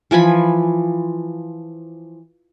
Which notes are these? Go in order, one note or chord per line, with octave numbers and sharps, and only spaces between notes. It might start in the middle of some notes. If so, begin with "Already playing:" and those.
E3 F3 G#5 B5